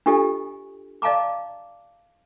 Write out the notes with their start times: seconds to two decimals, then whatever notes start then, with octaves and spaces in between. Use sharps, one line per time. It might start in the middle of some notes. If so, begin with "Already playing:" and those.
0.06 D4 F4 G4 A4 D#5 G#5
1.02 D5 D#5 F5 A5 A#5 D6